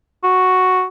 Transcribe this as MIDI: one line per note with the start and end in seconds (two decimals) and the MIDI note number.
0.23 0.84 66